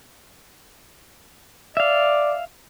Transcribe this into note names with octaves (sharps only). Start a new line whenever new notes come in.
D5 E5 F5